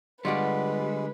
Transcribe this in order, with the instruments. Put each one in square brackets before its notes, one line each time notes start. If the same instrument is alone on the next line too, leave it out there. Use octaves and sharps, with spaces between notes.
[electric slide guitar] D3 G3 [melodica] G#3 [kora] F4 F#4 D5 [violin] B4